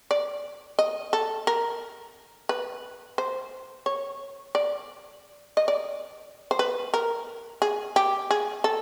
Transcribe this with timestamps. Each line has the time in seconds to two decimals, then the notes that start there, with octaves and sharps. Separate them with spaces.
0.11 D5
0.79 D#5
1.13 A4
1.47 A#4
2.49 B4
3.18 C5
3.86 C#5
4.55 D5
5.57 D#5
5.68 D5
6.51 C5
6.59 B4
6.94 A#4
7.62 G#4
7.96 G4
8.31 G#4
8.64 A4